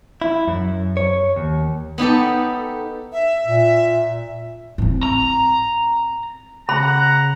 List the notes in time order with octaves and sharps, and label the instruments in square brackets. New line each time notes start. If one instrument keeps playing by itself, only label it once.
[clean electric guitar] E4
F#2
C#5
D#2
[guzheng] B3 D#4 G4 A4
[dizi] E5
[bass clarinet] A#2
[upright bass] A2 C4
[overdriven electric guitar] A#5
[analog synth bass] C#3 [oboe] F#5 [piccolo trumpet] A#5 [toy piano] B5